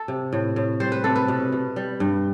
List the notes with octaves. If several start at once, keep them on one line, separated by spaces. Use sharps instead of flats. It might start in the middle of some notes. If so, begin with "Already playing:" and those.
Already playing: A4
C3
A2
A2
G3 C5
B4
C3 A4
B4
B2
B2
G3
G2